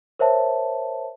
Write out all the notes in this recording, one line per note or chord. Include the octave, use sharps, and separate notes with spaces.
A#4 C5 C#5 E5 A5